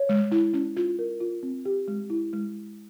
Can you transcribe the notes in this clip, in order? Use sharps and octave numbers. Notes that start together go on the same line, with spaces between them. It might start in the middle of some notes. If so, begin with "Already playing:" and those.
Already playing: C#5
G#3
E4
C#4
F4
A#4
F4
C4
G4
G#3
E4
G#3